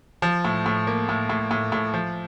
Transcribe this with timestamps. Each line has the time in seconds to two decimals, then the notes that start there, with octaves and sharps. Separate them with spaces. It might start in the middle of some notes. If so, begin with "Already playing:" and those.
0.22 F3
0.45 A2
0.66 A2
0.87 A#3
1.09 A2
1.29 A2
1.51 A2
1.72 A2
1.94 F3